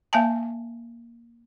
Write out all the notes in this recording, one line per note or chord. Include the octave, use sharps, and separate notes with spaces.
A#3 E5 F5 G#5 A5